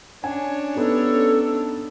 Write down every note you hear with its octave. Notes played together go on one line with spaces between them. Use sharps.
C#4 D4 C#5 G#5
B3 D#4 G4 A4